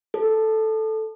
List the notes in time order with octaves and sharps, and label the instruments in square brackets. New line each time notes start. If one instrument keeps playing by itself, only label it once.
[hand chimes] A4